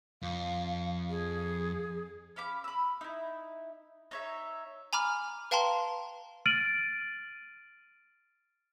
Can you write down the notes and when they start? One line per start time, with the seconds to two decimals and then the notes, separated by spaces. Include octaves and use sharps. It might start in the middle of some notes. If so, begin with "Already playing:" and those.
0.23 F2 F5
1.09 G#4
2.36 C#4 F5 B5 D6
2.64 B5 E6
3.01 D#4 E4
4.11 D#4 C#5 E5
4.93 G#5 A#5 B5 D6 F6
5.51 B4 F5 G5 A5 A#5 C6
6.46 F6 A6 D7 D#7 F#7